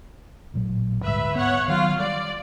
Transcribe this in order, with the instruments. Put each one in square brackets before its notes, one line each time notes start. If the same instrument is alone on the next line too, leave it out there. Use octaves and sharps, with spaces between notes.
[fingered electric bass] A1 A#2 F#3
[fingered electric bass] D2 G#2 G3 [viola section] B4 E5
[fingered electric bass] B3 [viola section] C#5 F#5
[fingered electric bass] D#3 F#3 [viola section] F4 F5
[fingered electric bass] G3 [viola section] D5